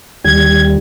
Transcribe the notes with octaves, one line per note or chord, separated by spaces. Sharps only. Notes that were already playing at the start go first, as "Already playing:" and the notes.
D#2 G3 G#6